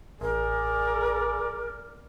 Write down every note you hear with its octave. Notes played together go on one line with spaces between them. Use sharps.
A1 G#4 A#4 D5